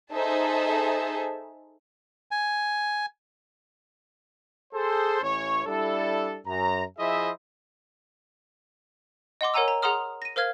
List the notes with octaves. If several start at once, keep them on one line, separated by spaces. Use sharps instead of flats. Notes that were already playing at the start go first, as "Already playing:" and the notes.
D#4 G#4 A4 C5 E5 A5
G#5
G#4 A4 C5
A1 E3 C#4 C#5
G3 D4 E4 A4
F#2 A#5
F3 E4 G#4 C5 D#5 E5
D#5 F#5 C6 D6
A#4 C#5 F#5 G#5 A#5 E6
A#5
G#4 F#5 A#5 C6 D#6 F6
A#6 D#7
A#4 C5 F5 F6 G#6